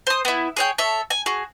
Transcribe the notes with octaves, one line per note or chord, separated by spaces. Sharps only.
C5 D#6
B3 E4
G#4 C#5 G5
A4 C#5 E5
G#5
F#4 G#4